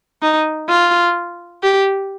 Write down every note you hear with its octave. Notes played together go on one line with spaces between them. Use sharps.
D#4
F4
G4